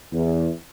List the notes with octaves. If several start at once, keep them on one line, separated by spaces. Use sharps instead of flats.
E2